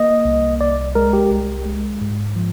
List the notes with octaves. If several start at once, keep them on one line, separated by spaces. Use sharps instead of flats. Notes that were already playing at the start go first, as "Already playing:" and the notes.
Already playing: A#3 D#5
C2
C2 D5
G#3 A#4
G4
C2
G#3
G#2
F3